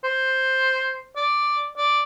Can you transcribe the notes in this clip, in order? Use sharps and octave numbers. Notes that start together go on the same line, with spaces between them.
C5
D5
D5